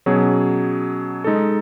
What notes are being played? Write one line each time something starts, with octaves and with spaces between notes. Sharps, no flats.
B2 F#3 C#4 G#4
G#3 D#4 A4